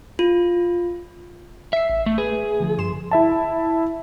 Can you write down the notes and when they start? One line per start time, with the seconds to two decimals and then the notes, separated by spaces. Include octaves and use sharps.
0.19 F4
1.73 E5 E6 C7
1.89 A1
2.06 A3
2.18 G#4 B4
2.60 D3 F3
2.78 G2 C6 E7
3.11 E4 E5 A5